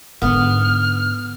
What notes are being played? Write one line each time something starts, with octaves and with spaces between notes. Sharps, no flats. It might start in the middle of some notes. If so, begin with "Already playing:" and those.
G#2 D3 B3 F6